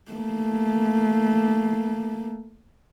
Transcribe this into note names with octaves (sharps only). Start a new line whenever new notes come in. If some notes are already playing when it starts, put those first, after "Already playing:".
A3 A#3